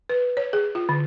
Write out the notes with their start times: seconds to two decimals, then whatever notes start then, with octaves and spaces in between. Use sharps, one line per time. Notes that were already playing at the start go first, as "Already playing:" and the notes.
0.09 B4
0.37 C#5
0.53 G#4
0.75 F4
0.89 D3